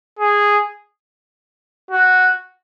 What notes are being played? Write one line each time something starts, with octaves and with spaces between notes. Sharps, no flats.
G#4
F#4